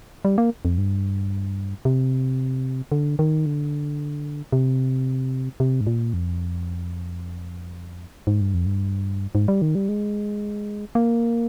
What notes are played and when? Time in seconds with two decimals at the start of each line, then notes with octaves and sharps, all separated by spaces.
0.25 G3
0.38 A#3
0.65 F2
0.78 G2
1.85 C3
2.92 D3
3.19 D#3
3.46 D3
4.53 C3
5.60 C3
5.81 G#2
5.87 A#2
6.14 F2
8.27 G#2
8.41 G2
8.54 F2
8.66 G2
9.35 G#2
9.48 G3
9.62 D#3
9.75 G3
9.89 G#3
10.95 A#3